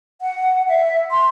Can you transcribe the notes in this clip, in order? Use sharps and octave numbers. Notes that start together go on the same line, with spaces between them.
F#5
E5
C6